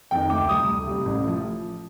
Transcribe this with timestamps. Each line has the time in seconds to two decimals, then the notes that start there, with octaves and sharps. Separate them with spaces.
0.11 F2 D#3 G5
0.30 D2 D6
0.48 C3 G3 D#6
0.68 D2
0.87 C3 G3
1.05 A1
1.24 A2 F3